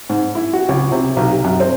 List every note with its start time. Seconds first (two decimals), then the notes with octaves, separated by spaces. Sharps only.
0.09 G#2
0.35 E4
0.53 F#4
0.69 C#2
0.92 C3
1.16 B1
1.30 G4
1.44 F#2
1.60 C4